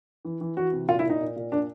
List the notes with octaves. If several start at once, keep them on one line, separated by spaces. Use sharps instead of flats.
E3
E3
E3 F#4
C3
A#2 F4
E4
A#2
D#4
A#2
A#2
A#2 D4